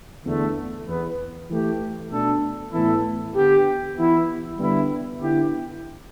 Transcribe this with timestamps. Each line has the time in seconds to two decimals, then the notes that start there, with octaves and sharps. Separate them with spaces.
0.24 E2 D3 A3
0.86 E2 E3 B3
1.48 E3 A3 G4
2.10 B2 A3 D4 A4
2.72 A2 E3 B3 E4 A4
3.34 D3 B3 G4
3.96 E3 B3 E4
4.58 D3 G3 B3 E4
5.19 D3 B3 E4 G4